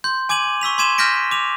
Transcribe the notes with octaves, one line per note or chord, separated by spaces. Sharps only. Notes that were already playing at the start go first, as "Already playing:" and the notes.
C6 G6
G#5 D6 G#6 D#7 F#7
C#6 E6 B6 F7
C6 D6 G#6 D#7 E7 G7
F6 G6 A#6 B6 D7
D6 F7